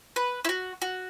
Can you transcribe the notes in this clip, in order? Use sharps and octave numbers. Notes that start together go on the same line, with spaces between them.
B4
E4
F#4
F#4